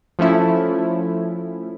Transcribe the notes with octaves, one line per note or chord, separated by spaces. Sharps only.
F3 A3 C#4 E4